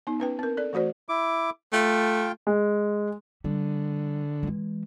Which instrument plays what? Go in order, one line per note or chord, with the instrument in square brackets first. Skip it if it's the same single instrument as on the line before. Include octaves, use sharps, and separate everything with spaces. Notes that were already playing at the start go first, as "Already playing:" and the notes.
[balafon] B3 D#4
C#4 B4 G5
C4 A#4
A4 D5
E3 A3 F#4 C5 D5
[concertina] E4 D6
[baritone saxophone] A3 [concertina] F4 G5
[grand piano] G#3
[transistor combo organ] D3 [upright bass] G3
[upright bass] E3 G#3